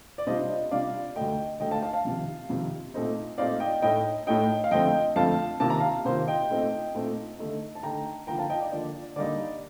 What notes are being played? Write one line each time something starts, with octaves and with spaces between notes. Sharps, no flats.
D5
C3 G3 D4 F4 C5 D#5
C3 G3 D4 F4 D5 F5
D2 D3 A3 D#5 G5
D2 D3 A3 D#5 G5
F5 A5
F5 A5
F5 A5
F2 C3 D#3
F2 C3 D#3
A#2 A3 C4 D#4
A#2 A3 C4 D#4 D5 F5
D#5 G5
A2 A3 D#4 D#5 G5
A2 A3 D#4 D#5 G5
F5
F2 D3 A3 C4 D#5 G5
F2 D3 A3 C4 F5 A5
C3 D#3 A#3 F4 A5
A#5
F5 A5
C3 D#3 A#3 F4 C5
D#5 G5
A#2 A3 C4 D#4
A#2 A3 C4 D#4
D3 A3 D#4
A5
D3 A3 D#4 G5 A#5
D3 F3 A#3 G5 A#5
F5 A5
D#5 G5
D5
D3 F3 A#3 D5
D3 G3 A#3 D#4 D5